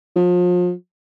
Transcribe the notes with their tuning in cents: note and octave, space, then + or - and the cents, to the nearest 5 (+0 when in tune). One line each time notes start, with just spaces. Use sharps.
F3 +35